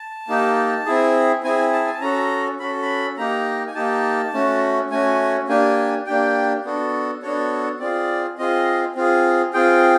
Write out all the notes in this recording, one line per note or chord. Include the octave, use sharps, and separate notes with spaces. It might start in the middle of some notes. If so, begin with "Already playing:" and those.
Already playing: A5
A#3 D#4 G4
C4 E4 G#4
C4 E4 G#4 G#5
A5
G#5
A5
C#4 F#4 A4 A#5
C#4 F#4 A4 B5
B5
A#3 D#4 G4 A#5
G#5
A#3 D#4 G4 A5
A3 C#4 F#4
A3 C#4 F#4 G#5
A#3 D4 G4 G#5
A#3 D4 G4 G5
B3 D4 F#4 A4
B3 D4 F#4 A4 C#5
C4 F4 G#4 D5
C4 F4 G#4 D#5
C4 F4 G#4
C4 F4 G#4 G5